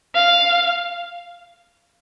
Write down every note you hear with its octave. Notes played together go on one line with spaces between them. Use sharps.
F5